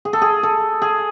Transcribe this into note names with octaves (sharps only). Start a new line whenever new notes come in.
G#4
A4
G#4
A4
G#4